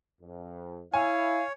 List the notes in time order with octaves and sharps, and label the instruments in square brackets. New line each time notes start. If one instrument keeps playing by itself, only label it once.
[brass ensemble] F2
[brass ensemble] E4 [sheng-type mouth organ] C#5 [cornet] F5 [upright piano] G#5